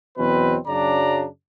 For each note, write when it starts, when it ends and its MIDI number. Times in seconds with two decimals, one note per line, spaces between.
0.18 0.56 40
0.18 0.56 47
0.18 0.56 54
0.18 0.56 60
0.18 0.56 71
0.67 1.25 42
0.67 1.25 49
0.67 1.25 54
0.67 1.25 62
0.67 1.25 74
0.67 1.25 82